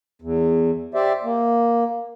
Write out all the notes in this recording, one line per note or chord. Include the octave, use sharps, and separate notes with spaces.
E2
G4 C5 D5 E5
A#3